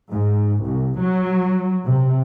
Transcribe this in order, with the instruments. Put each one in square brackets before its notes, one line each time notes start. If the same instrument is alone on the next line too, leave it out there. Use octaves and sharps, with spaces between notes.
[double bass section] G#2
C2
F#3
C3